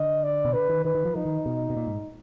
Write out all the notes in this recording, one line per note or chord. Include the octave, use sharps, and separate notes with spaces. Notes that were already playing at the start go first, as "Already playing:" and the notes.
Already playing: D3 D#5
D5
B2
D3 B4
D#3
D#3 B4
D#3
F3
F3 D#4
D#3
B2
B2
A#2
G#2